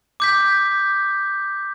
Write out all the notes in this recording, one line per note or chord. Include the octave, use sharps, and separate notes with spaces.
D6 G6 B6